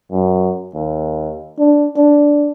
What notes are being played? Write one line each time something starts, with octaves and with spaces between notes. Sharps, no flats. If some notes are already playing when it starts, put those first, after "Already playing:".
F#2
D#2
D4
D4